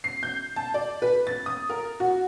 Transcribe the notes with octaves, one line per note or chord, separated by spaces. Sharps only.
C7
G6
A5
D5
B4
A6
D#6
A#4
F#4